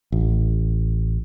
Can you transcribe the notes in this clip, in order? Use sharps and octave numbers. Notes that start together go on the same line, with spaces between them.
A1